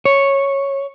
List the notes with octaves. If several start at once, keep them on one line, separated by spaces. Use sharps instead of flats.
C#5